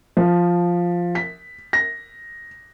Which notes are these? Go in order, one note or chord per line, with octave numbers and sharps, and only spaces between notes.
F3
B6
A#6